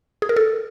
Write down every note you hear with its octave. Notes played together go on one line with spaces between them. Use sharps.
G#4
A#4
A4